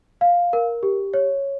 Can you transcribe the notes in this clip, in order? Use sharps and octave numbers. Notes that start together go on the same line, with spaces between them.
F5
A#4
G4
C#5